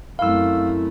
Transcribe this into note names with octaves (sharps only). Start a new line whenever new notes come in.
F#2 A3 C4 E4 F5 B5 E6